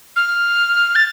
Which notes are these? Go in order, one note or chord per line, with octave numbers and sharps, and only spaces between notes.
F6
A6